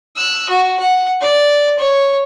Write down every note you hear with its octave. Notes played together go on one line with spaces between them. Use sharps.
E6 F#6
F#4
F#5
D5
C#5